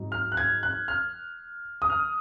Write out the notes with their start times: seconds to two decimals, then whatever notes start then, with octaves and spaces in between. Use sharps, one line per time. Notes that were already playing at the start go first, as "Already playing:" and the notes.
Already playing: G#2 F#3 C4 D#4
0.12 F6
0.32 F#6
0.37 G#6
0.63 F#6
0.88 F6
1.82 D#6
1.90 F6